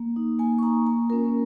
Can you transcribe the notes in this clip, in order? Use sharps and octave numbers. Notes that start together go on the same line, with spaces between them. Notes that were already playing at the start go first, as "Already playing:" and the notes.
Already playing: A#3
D#4
A#3 G#5
C#6
D#4 A#5
A#3 A#5
C#4 F4 A#4